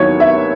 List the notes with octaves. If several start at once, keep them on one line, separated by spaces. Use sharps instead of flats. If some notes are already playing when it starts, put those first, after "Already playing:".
Already playing: D#2 D#3 F#3 B3 E4 C#5
E5